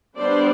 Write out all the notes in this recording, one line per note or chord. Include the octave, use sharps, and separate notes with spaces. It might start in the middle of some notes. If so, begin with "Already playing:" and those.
G3 B3 D4 C5 D5